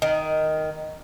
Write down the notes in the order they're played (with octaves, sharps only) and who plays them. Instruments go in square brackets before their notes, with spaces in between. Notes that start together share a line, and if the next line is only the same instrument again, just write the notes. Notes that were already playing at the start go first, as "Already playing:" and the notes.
[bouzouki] D#3